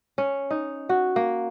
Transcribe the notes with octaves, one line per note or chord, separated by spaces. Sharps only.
C#4
D#4
F#4
A#3